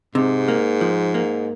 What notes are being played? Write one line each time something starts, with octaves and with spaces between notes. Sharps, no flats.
G#2 C3
A#3
F3
A#3